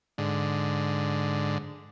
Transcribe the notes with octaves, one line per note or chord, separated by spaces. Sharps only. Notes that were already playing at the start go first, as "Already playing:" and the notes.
G#2 D3